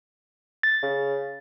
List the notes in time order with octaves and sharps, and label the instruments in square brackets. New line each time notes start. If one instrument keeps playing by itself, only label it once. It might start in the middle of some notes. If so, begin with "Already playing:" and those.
[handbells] A6
[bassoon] C#3